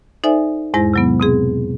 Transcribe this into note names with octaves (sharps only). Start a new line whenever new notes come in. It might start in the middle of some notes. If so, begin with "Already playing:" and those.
D#4 A4 C5 D5 E5 G#5
E2 G#2 G#3 E4 C5 A#6
C3 F#3 B3
B2 C4 G#4